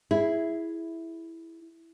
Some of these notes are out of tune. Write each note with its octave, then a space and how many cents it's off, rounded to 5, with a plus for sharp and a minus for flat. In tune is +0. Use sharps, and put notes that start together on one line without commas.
E4 +0 G#4 +0